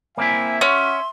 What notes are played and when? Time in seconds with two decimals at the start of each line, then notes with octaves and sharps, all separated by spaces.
0.17 A#3 C4 E4 E5 G#5
0.61 C#4 F#4 C6